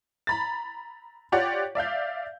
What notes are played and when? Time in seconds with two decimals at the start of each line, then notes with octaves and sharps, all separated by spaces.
0.27 A#5 B5 A6
1.32 F4 G4 C#5 D5 F#5
1.75 D5 E5 F5 G6